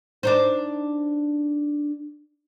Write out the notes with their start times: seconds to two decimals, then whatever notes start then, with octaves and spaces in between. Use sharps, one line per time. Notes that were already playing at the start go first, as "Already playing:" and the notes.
0.23 D4 D#4 C5